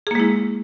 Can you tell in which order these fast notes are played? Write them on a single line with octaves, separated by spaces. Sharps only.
G#4 A#3 G#3 E4